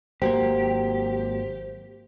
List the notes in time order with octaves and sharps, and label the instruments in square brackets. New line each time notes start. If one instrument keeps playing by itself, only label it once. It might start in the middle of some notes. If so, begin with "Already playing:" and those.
[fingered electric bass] G#1 F#3 A#3 [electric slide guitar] G4 [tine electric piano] C5